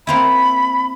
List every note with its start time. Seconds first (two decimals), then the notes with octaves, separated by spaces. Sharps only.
0.07 A#3 C4 E4 B5